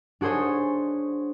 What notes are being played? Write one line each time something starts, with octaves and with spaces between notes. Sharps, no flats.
D4 F#4 G#4 C5 C#5